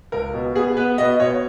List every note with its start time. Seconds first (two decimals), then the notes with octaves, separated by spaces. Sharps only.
0.12 C#2 A#4
0.34 B2
0.55 B3 G#4
0.77 B3 B4
0.98 B2 D#5
1.19 B2 C#5